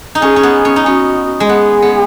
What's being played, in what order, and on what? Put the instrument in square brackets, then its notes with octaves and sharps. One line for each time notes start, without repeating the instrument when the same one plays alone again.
[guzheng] D#4
[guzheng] C#4 [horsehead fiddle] G#4
[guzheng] C#4
B3
C#4
D#4
[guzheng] C#4 [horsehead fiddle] F#4
[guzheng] G#3
[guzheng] B3 [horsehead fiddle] G#4
[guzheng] B3